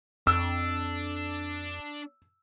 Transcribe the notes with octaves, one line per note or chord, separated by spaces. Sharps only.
F2 D4 E6